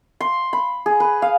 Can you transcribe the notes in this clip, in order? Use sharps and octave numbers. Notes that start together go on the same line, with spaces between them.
C6
B5
G#4
B4
F5